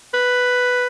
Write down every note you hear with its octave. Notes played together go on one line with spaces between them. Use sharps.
B4